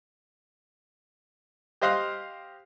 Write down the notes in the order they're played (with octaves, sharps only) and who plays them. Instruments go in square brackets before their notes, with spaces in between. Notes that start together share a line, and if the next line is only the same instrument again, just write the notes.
[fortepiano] G4 C5 D#5 F5 C6 F#6